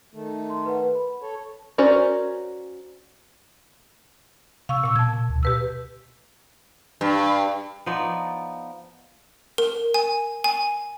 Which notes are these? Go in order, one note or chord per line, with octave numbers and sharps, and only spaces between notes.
D#3 A3
C6
B4 F#5
B5
A4 C#5
C#4 F#4 A#4 C5 D5
C3 F5 C#6 E6
A#2 E6
B2 A5 G#6
D2
B2 G4 B4 E6
G2
F3 B3 D#4 D5
A#4
G#5
G#5